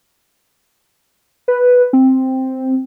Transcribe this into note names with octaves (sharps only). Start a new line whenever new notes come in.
B4
C4